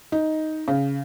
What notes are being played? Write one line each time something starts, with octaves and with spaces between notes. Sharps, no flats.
D#4
C#3